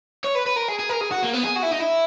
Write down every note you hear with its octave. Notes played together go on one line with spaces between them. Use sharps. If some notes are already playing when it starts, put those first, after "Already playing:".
C#5
B4
B4
A#4
G#4
G#4
A#4
G#4
F#4
A#3
B3
G#4
F#4
E4
D#4
E4